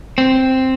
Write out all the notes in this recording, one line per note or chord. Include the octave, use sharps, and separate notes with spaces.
C4